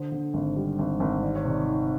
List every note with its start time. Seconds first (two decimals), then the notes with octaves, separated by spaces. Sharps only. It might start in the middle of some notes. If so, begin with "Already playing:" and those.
Already playing: D3 C5
0.12 D3
0.34 G#1
0.56 G3
0.79 G#1
1.00 G#1
1.23 D#3 D5
1.36 C#5
1.45 C3 D5
1.66 D#3